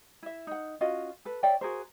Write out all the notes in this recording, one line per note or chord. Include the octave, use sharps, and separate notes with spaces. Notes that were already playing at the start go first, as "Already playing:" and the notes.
E4 E5
D#4 F#5
C#4 F4 F#4 D#5
A4 B4
C#5 D5 E5 G5
F#4 G#4 A#4 C5